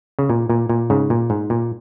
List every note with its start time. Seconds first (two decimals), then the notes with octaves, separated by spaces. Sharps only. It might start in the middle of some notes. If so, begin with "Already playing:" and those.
0.19 C#3
0.30 A#2
0.50 A#2
0.69 A#2
0.90 G#2 C#3
1.10 A#2
1.30 G#2
1.50 A#2